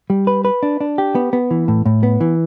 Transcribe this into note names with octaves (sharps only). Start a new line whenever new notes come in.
G3
B4
B4
D4
D4
G4
B3
B3
E3
A2
A2
B3
E3